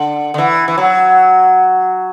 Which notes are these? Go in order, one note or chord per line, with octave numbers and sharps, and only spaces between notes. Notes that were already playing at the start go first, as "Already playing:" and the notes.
Already playing: D3
D3
E3
E3
F#3